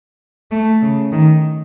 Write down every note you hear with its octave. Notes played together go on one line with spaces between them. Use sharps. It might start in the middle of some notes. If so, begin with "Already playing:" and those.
A3
C#3
D#3